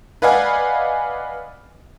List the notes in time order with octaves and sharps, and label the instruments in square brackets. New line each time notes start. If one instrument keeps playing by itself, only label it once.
[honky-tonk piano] B4 D5 D#5 F5 F#5 G#5